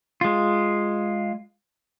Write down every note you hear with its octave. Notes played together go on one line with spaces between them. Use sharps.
G#3 F4